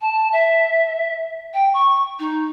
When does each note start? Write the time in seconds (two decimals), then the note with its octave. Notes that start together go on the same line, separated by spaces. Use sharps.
0.01 A5
0.32 E5
1.54 G5
1.74 C#6
2.19 D#4